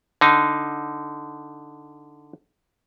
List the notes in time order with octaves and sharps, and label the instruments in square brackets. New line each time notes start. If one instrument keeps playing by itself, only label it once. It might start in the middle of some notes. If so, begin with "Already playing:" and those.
[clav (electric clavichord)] D3 D#4